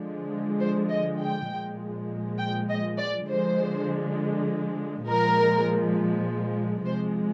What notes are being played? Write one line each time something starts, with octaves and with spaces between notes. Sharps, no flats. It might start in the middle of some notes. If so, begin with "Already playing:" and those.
Already playing: D3 F3 G#3
C5
D#5
G5
A#2 F3 G#3
G5
D#5
D5
D3 F3 G#3 C5
A#2 F3 G#3 A#4
C3 F3 G#3 C5